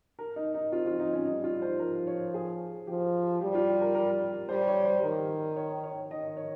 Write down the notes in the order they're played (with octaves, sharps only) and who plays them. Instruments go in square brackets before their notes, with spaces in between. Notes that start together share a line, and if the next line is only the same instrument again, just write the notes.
[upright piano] A#4
D#4
D#4
[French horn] C4 [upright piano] F4
[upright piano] F4
D#4
C#4
[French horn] G3 [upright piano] D#4
[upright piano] F4
C5
[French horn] F3 [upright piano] A#4
[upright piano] C#5
G#4
[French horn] F3 [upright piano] G4
[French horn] G3 [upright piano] G4
[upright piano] F4
G4
A#4
A#4
[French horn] G3 [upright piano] C5
[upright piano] C#5
C5
[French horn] D#3 [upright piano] A#4
[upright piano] C#5
C#5
[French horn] D#3 [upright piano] D#5
[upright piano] C#5